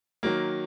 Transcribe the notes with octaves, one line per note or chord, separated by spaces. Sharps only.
D#3 F#3 A#3